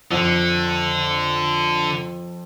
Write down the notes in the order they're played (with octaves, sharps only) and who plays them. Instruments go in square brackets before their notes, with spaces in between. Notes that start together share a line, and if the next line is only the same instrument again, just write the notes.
[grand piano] F2 [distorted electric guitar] D3